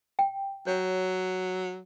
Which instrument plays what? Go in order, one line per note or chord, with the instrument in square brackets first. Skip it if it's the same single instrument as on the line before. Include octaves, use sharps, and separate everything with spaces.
[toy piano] G5
[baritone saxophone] F#3 [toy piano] C#5